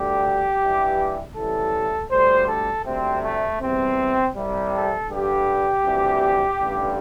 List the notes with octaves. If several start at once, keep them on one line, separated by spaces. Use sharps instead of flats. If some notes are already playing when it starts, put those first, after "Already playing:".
Already playing: D2 D3 G3 G4
G2 E3 G3
A1 A2 E3 G3 A4
D2 D3 G3 C5
A4
D2 C3 G3 C4
A3
E2 C3 G3 C4
C2 C3 G3
A4
G2 D3 G3 G4
D2 C3 E3 G3
A1 G2 D3 G3